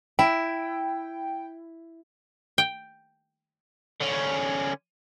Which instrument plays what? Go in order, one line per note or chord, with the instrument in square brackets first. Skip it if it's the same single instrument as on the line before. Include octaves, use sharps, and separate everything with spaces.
[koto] E4 [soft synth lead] G5
[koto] G5
[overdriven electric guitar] D3 C#4